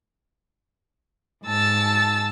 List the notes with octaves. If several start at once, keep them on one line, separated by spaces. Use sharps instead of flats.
G#2 A5 E6 A6